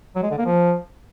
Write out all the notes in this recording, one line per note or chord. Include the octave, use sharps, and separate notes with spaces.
F#3
G#3
D3
A#3
F3